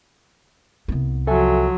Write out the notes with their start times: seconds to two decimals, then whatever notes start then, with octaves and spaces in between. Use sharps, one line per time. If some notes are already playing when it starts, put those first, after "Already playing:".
0.88 C2 B3
1.27 F3 F#3 A4 E5 G#5